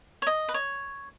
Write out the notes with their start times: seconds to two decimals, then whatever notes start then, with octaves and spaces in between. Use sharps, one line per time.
0.22 C#5
0.27 D#5
0.48 B4
0.54 C#5